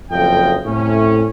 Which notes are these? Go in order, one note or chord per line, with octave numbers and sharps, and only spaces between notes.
F#1 F2 F4 A4 D#5 G5
A2 C3 C#4